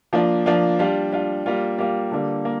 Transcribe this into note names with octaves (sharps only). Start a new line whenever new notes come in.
F3 A#3 D4 F4
F3 A#3 D4 F4
G3 D4 F4
G3 D4 F4
G3 A#3 F4
G3 A#3 F4
D3 G3 A#3
A#3